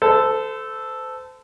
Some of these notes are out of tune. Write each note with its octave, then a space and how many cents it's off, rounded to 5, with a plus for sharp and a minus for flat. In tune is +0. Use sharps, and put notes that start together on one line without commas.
A4 +0 C5 -35